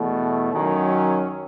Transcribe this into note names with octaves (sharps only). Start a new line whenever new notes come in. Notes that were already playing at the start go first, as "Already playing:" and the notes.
Already playing: E2 B2 A3
F#2 D#3 F#3 C#4